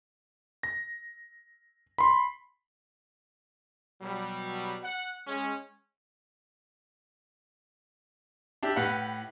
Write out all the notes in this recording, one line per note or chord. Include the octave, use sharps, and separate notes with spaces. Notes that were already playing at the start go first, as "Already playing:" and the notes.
A#6
B5 C6
B2 F#3 G3
F#5
G#3 C#4
D4 E4 G4
A2 G4 B4 F5 F#5